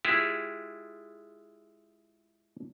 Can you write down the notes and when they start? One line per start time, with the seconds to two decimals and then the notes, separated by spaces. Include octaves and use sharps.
0.05 G#3 E4 F4 G4 G#4